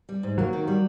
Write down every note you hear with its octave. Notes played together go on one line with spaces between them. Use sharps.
G3
G#2
F#3 A#3
D#3
G3